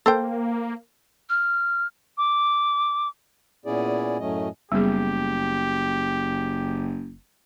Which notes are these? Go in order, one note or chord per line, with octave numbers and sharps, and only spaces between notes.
A#3 A4 C5 G5
F6
D6
A#2 B3 C#4 E4 G#4 D5
F#2 A2 F#3 A3 C#4 D#5
F#1 G3 B3 G4 G#4